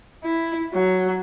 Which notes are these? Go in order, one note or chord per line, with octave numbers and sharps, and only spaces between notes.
E4
F#3